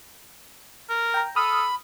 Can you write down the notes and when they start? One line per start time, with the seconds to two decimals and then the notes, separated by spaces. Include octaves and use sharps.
0.89 A#4
1.14 G5 A#5
1.36 A4 B5 D#6 F6